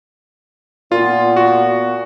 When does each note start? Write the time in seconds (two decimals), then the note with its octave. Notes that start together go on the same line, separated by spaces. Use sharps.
0.92 A#2 B3 F4
1.37 F#4